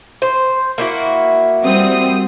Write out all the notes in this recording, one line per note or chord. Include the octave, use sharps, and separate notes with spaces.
C5
A#3 E4 F#4
G3 C4 D#6